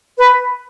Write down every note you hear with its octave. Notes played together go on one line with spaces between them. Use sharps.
B4